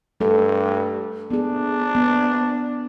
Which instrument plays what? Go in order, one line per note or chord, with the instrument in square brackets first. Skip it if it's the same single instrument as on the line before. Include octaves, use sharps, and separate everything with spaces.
[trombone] G2 [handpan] A3 A4
[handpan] B3 G#4 [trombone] D4
[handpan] B3